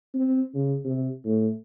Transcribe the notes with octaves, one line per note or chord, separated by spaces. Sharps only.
C4
C#3
C3
A2